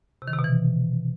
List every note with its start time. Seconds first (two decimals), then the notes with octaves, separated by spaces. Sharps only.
0.22 C3
0.28 D#3
0.33 C3
0.39 B2
0.44 E3